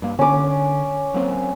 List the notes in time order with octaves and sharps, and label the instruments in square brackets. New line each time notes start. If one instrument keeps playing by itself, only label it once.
[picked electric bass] G2 A#3
[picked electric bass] D3 [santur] C#4 D6
[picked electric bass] F#3 A#3 C4